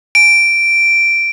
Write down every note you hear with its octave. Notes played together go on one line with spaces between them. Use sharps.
D7